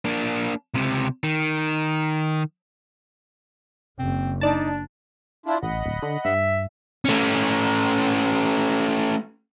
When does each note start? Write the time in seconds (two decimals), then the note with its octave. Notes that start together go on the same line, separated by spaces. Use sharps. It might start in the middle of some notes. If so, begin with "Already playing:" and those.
0.05 A#3 D4
0.74 C#2 C3
1.23 D#3
3.99 F#1 C4
4.41 D4 D#4 D5 A5
5.46 D4 E4 F4
5.63 A1 D#5 F#5 B5
5.86 D1
6.03 D3
6.25 G2 E5
7.05 A3 C#4